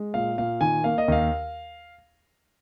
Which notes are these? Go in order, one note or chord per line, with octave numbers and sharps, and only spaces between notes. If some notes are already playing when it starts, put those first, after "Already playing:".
Already playing: G#3
A#2 F5
A#2 F5
D#3 G#5
A#3 F5
D#5
D#2 F5